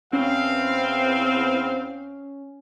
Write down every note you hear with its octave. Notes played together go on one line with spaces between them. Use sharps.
E2 C4 C#4 F5